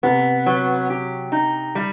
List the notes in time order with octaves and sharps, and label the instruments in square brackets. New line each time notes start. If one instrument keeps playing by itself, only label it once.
[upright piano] C3 [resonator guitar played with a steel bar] B3
[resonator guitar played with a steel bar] F#3
G4
D#4
G3